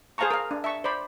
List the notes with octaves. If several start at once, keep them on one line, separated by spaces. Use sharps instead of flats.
G#4 C5 F5 A5 A#5 C#6
A#4 F5
D4
E5 A5 C#6
C5 D5 B5